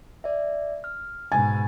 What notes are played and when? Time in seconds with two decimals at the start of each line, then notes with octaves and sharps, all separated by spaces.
0.24 D5 E5
0.84 F6
1.32 G#2 B2 G#5 A6